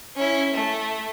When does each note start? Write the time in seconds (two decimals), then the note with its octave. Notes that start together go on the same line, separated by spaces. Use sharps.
0.16 C#4 E4
0.54 A3